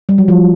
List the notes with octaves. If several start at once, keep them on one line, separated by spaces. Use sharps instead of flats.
G3
F#3
F3